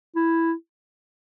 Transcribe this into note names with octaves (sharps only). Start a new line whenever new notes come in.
E4